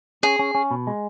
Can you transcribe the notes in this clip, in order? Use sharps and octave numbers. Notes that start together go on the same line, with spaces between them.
C#4 G#4
C#4
C#4
B2
G#3